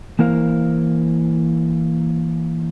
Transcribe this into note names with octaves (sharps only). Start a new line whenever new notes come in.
E3 A#3 E4 A#4 C5 F5